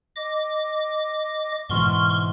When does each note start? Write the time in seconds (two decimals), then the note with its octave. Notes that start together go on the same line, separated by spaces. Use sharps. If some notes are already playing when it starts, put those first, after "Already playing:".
0.16 D#5 D6
1.70 G#2 B2 E3 C6 C#6 F6